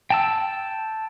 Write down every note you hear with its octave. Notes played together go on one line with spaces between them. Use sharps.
G5 A5 E6